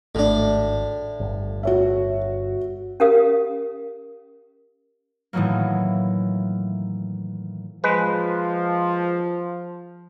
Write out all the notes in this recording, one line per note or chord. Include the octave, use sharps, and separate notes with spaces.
G#1 A2 A3 D4
G1
F#4 C#5 E5
C#4 G4 A#4 F5 D#6
A2 D#3 E3 F#3 A#3
F3 G#3 B4